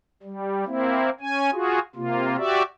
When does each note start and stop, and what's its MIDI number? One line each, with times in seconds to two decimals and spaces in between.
0.23 0.65 55
0.66 1.10 58
0.66 1.10 60
0.66 1.10 64
1.21 1.50 61
1.21 1.50 80
1.53 1.79 65
1.53 1.79 66
1.53 1.79 68
1.96 2.36 48
1.96 2.36 58
1.96 2.36 65
2.38 2.62 66
2.38 2.62 67
2.38 2.62 74
2.38 2.62 76